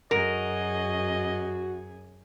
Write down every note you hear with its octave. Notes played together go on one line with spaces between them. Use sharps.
F#2 F#4 G#4 A#4 D#5